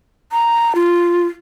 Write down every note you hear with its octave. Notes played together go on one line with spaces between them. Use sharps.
A#5
F4